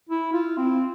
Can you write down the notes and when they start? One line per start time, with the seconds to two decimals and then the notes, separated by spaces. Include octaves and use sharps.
0.09 E4
0.33 F4
0.57 C4